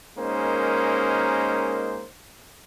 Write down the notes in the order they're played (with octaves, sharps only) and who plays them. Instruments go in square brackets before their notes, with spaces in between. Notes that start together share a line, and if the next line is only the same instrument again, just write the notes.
[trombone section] G#3 A#3 C#4 D#4 A#4 C5